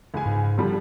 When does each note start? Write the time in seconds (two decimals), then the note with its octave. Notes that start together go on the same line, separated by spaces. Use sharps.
0.14 C#2 G#5
0.26 G#2
0.58 D3 F3 G3